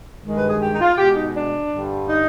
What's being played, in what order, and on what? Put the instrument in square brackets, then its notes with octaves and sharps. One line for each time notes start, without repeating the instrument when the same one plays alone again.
[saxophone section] G2 D#3 G#3
B4
G#4
G4
D#4
F4
B2 G#3 G4
D#4
D4
G2 D3 G3
D#4